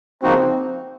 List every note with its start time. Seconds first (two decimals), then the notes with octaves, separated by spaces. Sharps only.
0.23 C#3 F3 A#3 C4 D#4 F#4